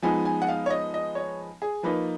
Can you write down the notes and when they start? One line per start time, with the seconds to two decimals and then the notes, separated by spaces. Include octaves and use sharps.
0.02 F3 G#3 B3 D#4 G#5
0.25 G#5
0.42 F#5
0.48 F5
0.66 C#5
0.70 D#5
0.94 D#5
1.15 C#5
1.62 G#4
1.83 F3 A#3 D#4 B4